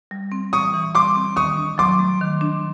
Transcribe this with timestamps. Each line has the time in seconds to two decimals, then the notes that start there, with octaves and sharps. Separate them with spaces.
0.11 G3
0.32 C4
0.52 E3 C#6 D#6
0.74 E3
0.95 G3 C6 D6
1.16 C4
1.36 D#3 C#6 D#6
1.57 D4
1.78 F#3 C6 D6
1.99 A3
2.21 D#3
2.41 D4